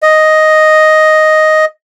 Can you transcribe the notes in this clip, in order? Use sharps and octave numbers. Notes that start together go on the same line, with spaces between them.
D#5